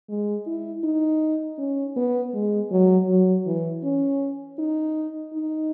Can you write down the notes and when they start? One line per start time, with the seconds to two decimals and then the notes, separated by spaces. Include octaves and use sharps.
0.09 G#3
0.47 E4
0.84 D#4
1.58 C#4
1.96 B3
2.34 G#3
2.71 F#3
3.08 F#3
3.46 E3
3.83 C#4
4.59 D#4
5.33 D#4